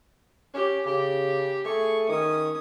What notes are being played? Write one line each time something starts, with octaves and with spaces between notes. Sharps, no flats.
C#4 G4
C#3 G4
A3 G#4 C#6
D#3 C#4 D#6